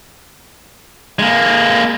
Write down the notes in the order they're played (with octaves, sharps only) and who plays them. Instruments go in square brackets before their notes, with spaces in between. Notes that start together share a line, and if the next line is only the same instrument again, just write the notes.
[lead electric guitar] G#3 A#3